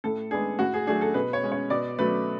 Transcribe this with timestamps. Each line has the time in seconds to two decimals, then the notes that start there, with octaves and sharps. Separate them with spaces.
0.04 A2 A4
0.31 G#3 B3 D4 G#4
0.59 A2 F#4
0.74 G#4
0.86 F#3 A3 D4 G#4
1.01 A4
1.14 B2 B4
1.33 C#5
1.43 G#3 C#4
1.52 C#5
1.70 B2 D5
1.98 F#3 A3 B4